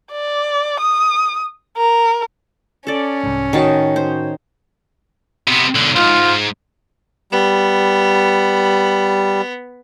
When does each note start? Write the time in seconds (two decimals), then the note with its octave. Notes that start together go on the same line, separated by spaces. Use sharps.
0.12 D5
0.80 D#6
1.77 A#4
2.87 C#4 A4 D5
3.23 C2 G#2
3.53 A2 D#3 D#4 F#4 C#5 A5
3.96 C5
5.47 C3 B3
5.75 B1 D3
5.96 C#2 G#2 F4
7.32 G3 B3